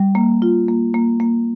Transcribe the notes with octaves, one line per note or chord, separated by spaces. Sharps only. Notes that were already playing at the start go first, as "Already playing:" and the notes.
Already playing: G3
A#3
F4
A#3
A#3
A#3